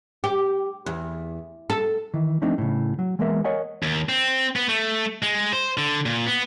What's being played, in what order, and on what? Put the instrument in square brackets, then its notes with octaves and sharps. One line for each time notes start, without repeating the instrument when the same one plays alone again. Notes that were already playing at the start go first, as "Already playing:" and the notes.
[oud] G4
E2
A4
[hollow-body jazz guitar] D#3 E3
F3 A3 C4 D4 D#4
A2 C#3
F#3
E3 G#3 A#3 B3 A#4 E5
A#4 C#5 D#5 F#5 G#5
[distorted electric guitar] D#2
C4
B3
A3
G#3
C5
D3
A#2
B3